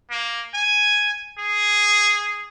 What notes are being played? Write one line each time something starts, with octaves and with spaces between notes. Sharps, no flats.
A#3
G#5
G#4